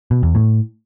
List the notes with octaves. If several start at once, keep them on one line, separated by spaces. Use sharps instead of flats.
B2
E2
A2